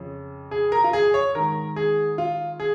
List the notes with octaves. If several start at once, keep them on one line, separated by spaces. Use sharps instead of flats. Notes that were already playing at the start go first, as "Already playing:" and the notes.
Already playing: F2 C#3
G#4
A#4
F4
G#4
C#5
G#2 D#3 A#4
G#4
F4
G#4